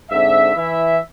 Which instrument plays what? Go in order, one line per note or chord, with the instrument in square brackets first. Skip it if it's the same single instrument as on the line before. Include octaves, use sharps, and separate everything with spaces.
[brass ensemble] G#2 D3 C4 E5
E3 E4 E5